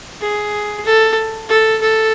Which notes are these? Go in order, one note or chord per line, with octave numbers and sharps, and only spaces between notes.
G#4
A4
A4
A4